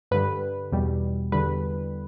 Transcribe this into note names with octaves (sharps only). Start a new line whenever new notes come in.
G2 D3 G3 B4
E2 B2 G3
E2 D3 G3 B4